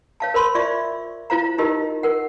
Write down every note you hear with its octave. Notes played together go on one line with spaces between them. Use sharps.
C#5 F5 A5
A#4 C5 B5 C6
F4 D5 E5 C#6
E4 F4 C5 F5 A#5
D#4 F4 G4 A#4 D#5
A#4 F#5